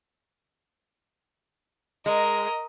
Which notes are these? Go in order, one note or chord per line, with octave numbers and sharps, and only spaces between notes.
G#3 A#4 D#5